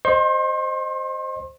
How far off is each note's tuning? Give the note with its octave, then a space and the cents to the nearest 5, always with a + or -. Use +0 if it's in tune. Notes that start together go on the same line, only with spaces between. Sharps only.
C5 +5 D#5 -10 C6 +40